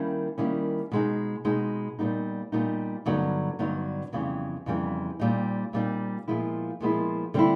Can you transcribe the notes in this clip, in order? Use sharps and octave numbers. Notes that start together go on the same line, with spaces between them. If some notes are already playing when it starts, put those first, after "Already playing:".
Already playing: D#3 G3 A#3 C#4 E4
D#3 G3 A#3 C#4 E4
B2 G#3 C4 D#4
B2 G#3 C4 D#4
A#2 G3 B3 D#4
A#2 G3 B3 D#4
G2 D3 F#3 B3 D#4
G2 D3 F#3 B3 D#4
F2 C#3 E3 G3 B3
F2 C#3 E3 G3 B3
A#2 G3 C4 D#4
A#2 G3 C4 D#4
A#2 F3 G#3 B3 E4
A#2 F3 G#3 B3 E4
D3 G3 C4 E4